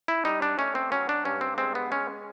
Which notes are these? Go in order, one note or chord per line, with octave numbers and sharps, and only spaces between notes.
E4
G3 D#4
D4
A3 C#4
C4
F#3 C#4
D4
G2 C#4
C4
G#3 C4
B3
G#3 C#4